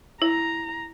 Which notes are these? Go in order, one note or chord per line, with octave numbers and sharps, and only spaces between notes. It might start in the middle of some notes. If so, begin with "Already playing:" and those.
E4 A#5